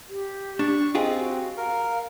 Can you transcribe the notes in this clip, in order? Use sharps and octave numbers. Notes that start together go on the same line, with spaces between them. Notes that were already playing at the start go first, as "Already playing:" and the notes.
G4
D4 C#6
C4 F4 G4 G#4 D#5
F#4
A#4 F5